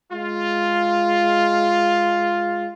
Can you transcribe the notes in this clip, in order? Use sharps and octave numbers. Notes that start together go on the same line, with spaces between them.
G#3 F4